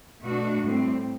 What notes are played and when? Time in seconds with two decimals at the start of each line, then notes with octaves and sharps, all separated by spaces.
0.24 B2 A3 D4 F#4
0.62 A2 G3 C4